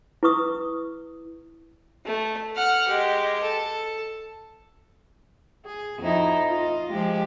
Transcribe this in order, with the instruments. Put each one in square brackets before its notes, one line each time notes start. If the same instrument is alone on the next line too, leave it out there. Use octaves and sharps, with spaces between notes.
[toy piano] E4 B4 C#6 D#6
[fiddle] A3
F#5 F6
G#3 G4
A4
[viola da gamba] G#4
F2 D#4 E4
F4 D#5
F3 G#3 G4